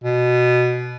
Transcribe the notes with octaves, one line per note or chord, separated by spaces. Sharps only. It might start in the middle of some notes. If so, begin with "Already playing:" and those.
B2